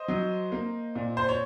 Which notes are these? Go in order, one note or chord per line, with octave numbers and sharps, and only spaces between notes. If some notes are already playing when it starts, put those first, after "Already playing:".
Already playing: C5 D#5
F#3
A#3
A#2
C5
C#5